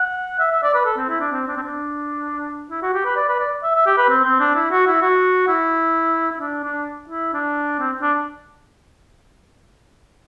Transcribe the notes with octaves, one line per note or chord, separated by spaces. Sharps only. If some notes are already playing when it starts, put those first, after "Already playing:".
Already playing: F#5
E5
E5
D5
B4
A4
C4
E4
D4
C4
D4
C4
D4
E4
F#4
G4
B4
D5
B4
D5
E5
E5
G4
B4
C4
C4
D4
E4
F#4
E4
F#4
E4
E4
D4
D4
E4
D4
C4
D4